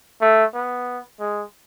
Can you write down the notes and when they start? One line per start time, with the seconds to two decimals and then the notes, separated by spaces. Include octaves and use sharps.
0.21 A3
0.54 B3
1.20 G#3